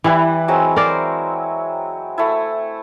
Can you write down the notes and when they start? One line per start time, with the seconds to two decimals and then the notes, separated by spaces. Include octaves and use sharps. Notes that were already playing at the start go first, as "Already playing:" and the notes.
0.04 E3 G3 E4 B4
0.48 F#3 G#3 C4
0.76 A#4 C5 D5
2.18 A3 E4